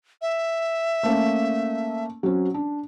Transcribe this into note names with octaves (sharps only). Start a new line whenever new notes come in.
E5
A3 A#3 C#4
F#3 C4 C#4
D4